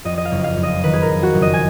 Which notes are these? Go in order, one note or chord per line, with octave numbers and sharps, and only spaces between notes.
F2 D#5
D#5
F5
F#1
F5
F2
D#5
D#3 B4
G#4
A#4
F2
F#4
F#1
D#5
G#5